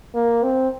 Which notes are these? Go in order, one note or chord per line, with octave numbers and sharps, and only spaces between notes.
A#3
C4